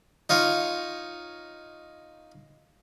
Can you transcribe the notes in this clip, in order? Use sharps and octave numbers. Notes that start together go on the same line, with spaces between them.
D#4 F4 C#5